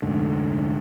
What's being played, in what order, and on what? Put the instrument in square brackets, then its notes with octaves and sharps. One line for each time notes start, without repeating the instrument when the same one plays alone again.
[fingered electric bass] F1 D2 G#2 D3